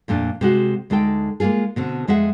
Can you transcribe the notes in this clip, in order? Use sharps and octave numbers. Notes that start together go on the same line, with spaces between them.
F2 A#2 A3 D4
C3 G#3 F#4
D2 G#3 D#4 A4 G5
G#3 A#3 D4 F4 G#4
B2 D3 C4
F2 G#3 G#4 E5 F#5